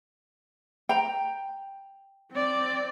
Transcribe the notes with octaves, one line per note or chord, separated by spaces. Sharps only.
G5 A#5
C4 D5